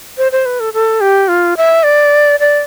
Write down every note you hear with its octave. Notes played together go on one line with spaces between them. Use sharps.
C5
C5
B4
A4
A4
G4
F4
E5
D5
D5